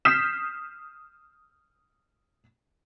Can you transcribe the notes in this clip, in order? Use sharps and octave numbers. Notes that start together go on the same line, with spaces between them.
D#6 F6 G6 B6 C7 E7